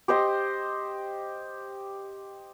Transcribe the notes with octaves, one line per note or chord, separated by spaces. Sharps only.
G4 C5 D#5 G5